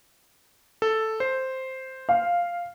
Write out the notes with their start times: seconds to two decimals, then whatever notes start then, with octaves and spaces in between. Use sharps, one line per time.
0.82 A4
1.20 C5
2.09 F5